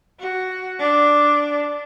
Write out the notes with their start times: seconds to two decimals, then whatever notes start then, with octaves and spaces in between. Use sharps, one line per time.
0.20 F#4
0.79 D4